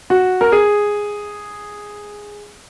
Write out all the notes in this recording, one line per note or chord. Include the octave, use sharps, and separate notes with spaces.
F#4
A#4
G#4